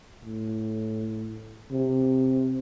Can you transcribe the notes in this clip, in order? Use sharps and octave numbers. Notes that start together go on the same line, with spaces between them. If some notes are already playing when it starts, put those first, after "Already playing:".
A2
C3